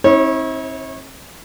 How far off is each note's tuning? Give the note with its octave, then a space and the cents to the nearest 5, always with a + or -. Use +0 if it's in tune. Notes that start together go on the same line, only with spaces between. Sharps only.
C4 +40 E4 -45 C#5 -20